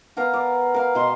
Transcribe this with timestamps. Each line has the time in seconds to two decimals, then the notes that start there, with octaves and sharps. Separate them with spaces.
0.17 B3 A#4 F5 A#5
0.34 D5
0.74 A#4 F5
0.95 B2 D#5 G#5 C6